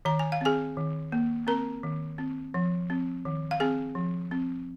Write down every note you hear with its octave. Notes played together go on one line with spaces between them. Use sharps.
D#3 A#5
G#5
F5
C4 G#4 G#5
D#3
A#3
C4 A#4 A#5
D#3
C4
F3
C4
D#3
F5
C4 G#4 G#5
F3
C4